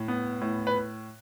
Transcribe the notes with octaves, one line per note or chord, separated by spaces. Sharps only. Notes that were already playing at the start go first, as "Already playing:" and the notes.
Already playing: A2
B3
A2
B4